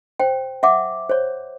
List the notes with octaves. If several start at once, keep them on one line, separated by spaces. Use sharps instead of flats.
C5 G5
E5 F#5 D6
C5 C#5